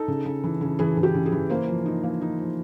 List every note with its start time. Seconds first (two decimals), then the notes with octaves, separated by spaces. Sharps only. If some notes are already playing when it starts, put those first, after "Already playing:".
Already playing: D#4 A4
0.08 C#3
0.25 C#3
0.44 E3
0.61 C#3
0.79 E3 G#4
0.97 E3
1.03 G4
1.14 C#3
1.26 G#4
1.32 E3
1.50 A#3 C5
1.68 F3
1.86 D#4
2.03 A#3
2.21 D#4
2.38 F3